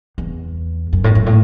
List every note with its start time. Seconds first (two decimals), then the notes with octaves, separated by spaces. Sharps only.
0.18 E2
0.93 F#2
1.04 A2
1.15 F#2
1.26 A2